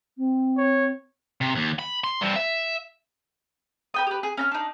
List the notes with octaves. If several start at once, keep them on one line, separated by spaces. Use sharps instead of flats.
C4
C#5
C3
D#2
B5
C6
G2 C4
E5
B4 G5 D#6
G4 B4
G#4
C#4 A#5 F6
D4 D#4